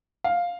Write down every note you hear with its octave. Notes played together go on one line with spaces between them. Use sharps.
F5